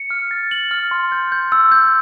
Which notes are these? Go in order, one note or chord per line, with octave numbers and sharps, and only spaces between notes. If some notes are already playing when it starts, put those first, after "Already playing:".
Already playing: C#7
F6
A6
F#7
F6
C6
G6
G6
E6
G6